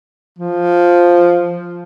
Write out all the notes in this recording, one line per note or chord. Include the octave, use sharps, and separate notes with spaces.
F3